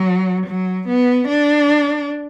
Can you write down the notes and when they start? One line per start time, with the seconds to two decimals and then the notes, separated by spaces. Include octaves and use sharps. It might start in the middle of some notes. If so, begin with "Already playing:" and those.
Already playing: F#3
0.47 F#3
0.88 B3
1.29 D4